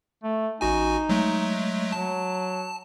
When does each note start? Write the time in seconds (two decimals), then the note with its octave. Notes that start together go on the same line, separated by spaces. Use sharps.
0.24 A3
0.61 A1 D#4 F#4 G#5
1.09 F#3 G#3 A3
1.92 F#3 A5